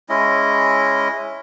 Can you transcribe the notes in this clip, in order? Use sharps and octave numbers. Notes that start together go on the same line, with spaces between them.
G#3 C#4 E4 D#5